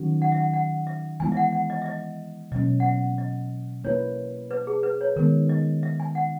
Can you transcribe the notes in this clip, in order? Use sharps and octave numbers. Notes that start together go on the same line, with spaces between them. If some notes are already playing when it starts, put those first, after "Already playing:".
Already playing: D#3 F#3 C#4 F#4
F#5
E5
F#5
F#5
E5
E3 G#3 B3 E4 G#5
E5
F#5
F#5
D#5
E5
D#5
B2 F#3 A#3 C#4 D#5
F#5
E5
D#5
A#3 E4 B4 C#5
B4
G#4
B4
C#5
D#3 G#3 B3 A#4
D#5
E5
G#5
F#5